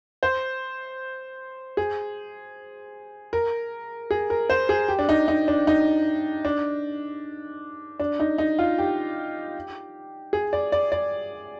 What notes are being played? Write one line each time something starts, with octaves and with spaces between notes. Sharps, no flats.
C5
G#4
A#4
G#4
A#4
C5
G#4
G4
D4
D#4
D#4
D4
D#4
D4
D4
D#4
D#4
F4
G4
G#4
D5
D5
D5